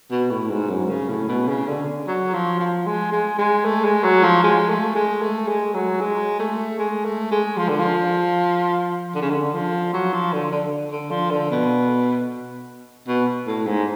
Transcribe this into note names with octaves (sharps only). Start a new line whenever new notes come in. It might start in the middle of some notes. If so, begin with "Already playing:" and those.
B2
A2
G#2
F#2
C#3
A2
B2
C#3
D3
F#3
F3
F3
G#3
G#3
G#3
A3
G#3
F#3
F3
G#3
A3
G#3
A3
G#3
F#3
G#3
A3
G#3
A3
G#3
F3
D3
F3
D3
C#3
D3
F3
F#3
F3
D3
D3
D3
F3
D3
B2
B2
A2
G#2